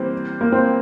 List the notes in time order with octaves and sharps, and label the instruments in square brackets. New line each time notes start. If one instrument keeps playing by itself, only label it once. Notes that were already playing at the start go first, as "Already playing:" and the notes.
Already playing: [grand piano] E3 G3 A#3 [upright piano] C4
[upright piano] A#3
C4